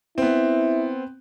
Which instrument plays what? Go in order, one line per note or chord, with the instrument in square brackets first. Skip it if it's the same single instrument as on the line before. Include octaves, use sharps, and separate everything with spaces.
[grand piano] B3 C4 [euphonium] E4